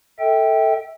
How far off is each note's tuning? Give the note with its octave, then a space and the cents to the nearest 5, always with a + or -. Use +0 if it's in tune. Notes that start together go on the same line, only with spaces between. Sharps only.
A4 +10 E5 -30 G5 +0